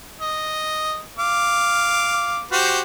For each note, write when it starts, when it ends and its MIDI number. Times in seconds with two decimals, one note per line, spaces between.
0.21 1.01 75
1.18 2.43 77
1.18 2.43 86
2.51 2.81 66
2.51 2.81 67
2.51 2.81 72